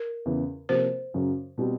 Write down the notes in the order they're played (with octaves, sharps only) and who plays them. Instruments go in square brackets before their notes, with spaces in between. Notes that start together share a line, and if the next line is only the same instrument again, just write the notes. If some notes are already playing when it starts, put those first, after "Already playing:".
Already playing: [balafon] A#4
[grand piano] E2 C#3 E3
[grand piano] C3 F3 A#3 [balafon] C5
[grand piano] F#2 C#3 F#3
B2 G3 C4